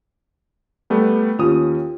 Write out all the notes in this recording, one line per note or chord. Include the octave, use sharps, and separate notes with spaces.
G3 A3 B3
D#2 C#4 F4 G4 D#6